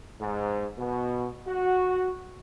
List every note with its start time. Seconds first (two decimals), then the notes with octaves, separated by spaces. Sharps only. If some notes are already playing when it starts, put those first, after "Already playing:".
0.21 G#2
0.78 B2
1.47 F#4